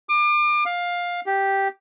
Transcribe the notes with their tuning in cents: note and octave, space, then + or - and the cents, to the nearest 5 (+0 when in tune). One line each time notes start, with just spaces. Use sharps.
D6 +35
F5 +15
G4 -5